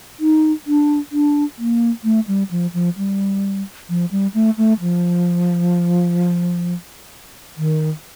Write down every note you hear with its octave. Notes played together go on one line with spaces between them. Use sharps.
D#4
D4
D4
A#3
A3
G3
F3
F3
G3
F3
G3
A3
A3
F3
D#3